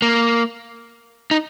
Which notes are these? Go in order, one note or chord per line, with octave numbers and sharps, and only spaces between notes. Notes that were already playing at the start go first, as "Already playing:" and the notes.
A#3
D#4